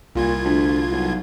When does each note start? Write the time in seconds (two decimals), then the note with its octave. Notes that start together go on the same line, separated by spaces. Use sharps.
0.15 C2 A#2 F4 G#6
0.44 D2
0.92 B1